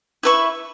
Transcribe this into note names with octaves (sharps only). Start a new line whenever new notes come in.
E4 B4 E5 C#6